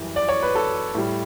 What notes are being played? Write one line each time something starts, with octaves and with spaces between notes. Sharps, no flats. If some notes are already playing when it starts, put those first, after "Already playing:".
Already playing: F#2 E3 G3
D5
C#5
B4
A4
A2 G3